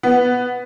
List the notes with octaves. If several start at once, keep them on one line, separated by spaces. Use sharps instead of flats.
B3